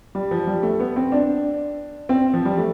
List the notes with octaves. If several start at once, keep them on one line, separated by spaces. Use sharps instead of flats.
G3
F3
G3
A3
B3
C4
D4
C4
F3
G3
A3